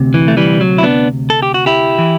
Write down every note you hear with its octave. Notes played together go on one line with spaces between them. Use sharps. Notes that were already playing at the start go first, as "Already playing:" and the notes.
Already playing: D2 C3
E3
A3
E3 G3
F#3
E4
B3 D4
A4
G4
F#4
E4 G4
E3